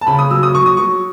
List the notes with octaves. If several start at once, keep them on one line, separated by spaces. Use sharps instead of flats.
A5
C#3 B5
D#6
F#3 E6
D#6
F#3 C#6
D#6
F#3 C#6